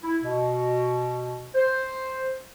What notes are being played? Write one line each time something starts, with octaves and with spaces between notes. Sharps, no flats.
E4
B2
C5